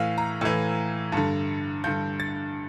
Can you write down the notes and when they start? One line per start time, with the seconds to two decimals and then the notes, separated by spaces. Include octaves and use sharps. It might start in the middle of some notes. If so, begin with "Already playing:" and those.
Already playing: A2 E3 F5
0.18 A#5
0.41 A2 E3
1.12 G2 D3
1.84 G2 D3 G6
2.20 A6